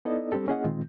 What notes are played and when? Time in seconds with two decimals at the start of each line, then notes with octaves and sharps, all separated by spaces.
0.05 B3 D#4 E4 A4 D5 D#5
0.32 G3 C4 D4 G4 A4
0.47 A#3 C#4 E4 G#4 D#5 F#5
0.64 A#2 D#3 G#3 C4 F4